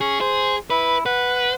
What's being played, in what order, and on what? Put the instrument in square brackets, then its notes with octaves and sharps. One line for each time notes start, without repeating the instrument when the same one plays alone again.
[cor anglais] C#4 [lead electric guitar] G#4
[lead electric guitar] G#4 [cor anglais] C5
[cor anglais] E4 [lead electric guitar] B4
[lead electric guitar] B4 [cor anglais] F#5